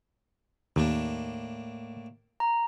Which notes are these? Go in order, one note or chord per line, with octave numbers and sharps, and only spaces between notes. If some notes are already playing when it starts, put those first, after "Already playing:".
D#2 A2 A#3 D4
A#5